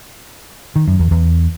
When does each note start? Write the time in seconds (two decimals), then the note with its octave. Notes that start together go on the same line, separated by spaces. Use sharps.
0.76 D#3
0.87 F#2
0.99 E2
1.11 E2